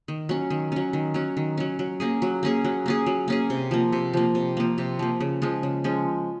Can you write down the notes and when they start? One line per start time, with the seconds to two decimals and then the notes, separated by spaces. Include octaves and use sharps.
0.08 D#3
0.29 F#3 C#4
0.50 D#3
0.72 F#3 C#4
0.93 D#3
1.14 F#3 C#4
1.37 D#3
1.58 F#3 C#4
1.79 F#3
2.00 A#3 C#4 G#4
2.22 F#3
2.43 A#3 C#4 G#4
2.64 F#3
2.86 A#3 C#4 G#4
3.06 F#3
3.28 A#3 C#4 G#4
3.50 C3
3.71 F3 A#3
3.92 C3
4.14 F3 A#3
4.35 C3
4.57 F3 A#3
4.78 C3
4.99 F3 A#3
5.20 C#3
5.42 F3 G#3 C#4
5.63 C#3
5.84 F3 G#3 C#4